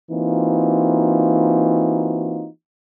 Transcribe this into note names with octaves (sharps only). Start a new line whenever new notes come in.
E3 A#3 C4 D#4 F4 F#4